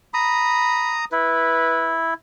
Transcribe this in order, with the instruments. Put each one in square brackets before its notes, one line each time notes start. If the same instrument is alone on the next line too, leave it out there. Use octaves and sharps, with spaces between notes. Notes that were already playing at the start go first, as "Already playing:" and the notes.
[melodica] A#5 D#6 [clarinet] B5
[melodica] E4 [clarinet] B4